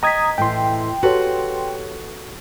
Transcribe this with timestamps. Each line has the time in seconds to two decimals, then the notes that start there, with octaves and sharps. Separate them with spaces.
0.03 D#5 G5 A#5 D#6 G#6 B6
0.38 A2 E3 G5 C6
1.03 F#4 G4 A4 B4 C#5